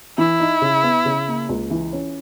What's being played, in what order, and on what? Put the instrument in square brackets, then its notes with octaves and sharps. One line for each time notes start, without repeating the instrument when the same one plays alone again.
[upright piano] E3 [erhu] E4
[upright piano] D#4
C#3
B3
C#3
A#3
C#2
E3
C#4